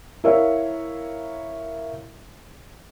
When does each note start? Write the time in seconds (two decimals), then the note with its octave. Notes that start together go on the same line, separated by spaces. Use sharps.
0.24 E4 A#4 C#5 E5 F5